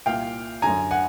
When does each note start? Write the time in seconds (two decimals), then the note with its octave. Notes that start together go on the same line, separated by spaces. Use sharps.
0.06 C2 A#2 F5 G5
0.62 F#2 D3 G#5 A#5
0.91 F#5 G#5